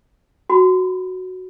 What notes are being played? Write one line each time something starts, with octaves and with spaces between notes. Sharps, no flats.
F#4 B5